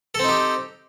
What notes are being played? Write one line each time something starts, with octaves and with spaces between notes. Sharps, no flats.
C4 D#4 G4 A4